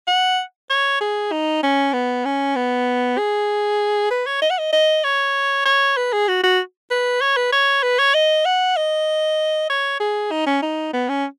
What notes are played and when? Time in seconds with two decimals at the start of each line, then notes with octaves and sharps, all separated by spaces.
0.07 F#5
0.70 C#5
1.01 G#4
1.32 D#4
1.63 C#4
1.93 B3
2.25 C#4
2.56 B3
3.18 G#4
4.11 B4
4.26 C#5
4.42 D#5
4.50 F#5
4.58 D#5
4.73 D#5
5.04 C#5
5.65 C#5
5.97 B4
6.13 G#4
6.28 F#4
6.43 F#4
6.91 B4
7.21 C#5
7.37 B4
7.52 C#5
7.83 B4
7.99 C#5
8.14 D#5
8.45 F#5
8.77 D#5
9.69 C#5
10.00 G#4
10.31 D#4
10.46 C#4
10.62 D#4
10.93 B3
11.09 C#4